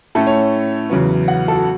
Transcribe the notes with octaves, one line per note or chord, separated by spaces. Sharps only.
A2 A3 C#4 A4
C#5
E2 C#3 F#3 B3
F#5
A4
F#4